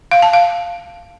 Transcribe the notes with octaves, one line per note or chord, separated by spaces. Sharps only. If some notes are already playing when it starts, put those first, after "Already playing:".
F5
A5
F5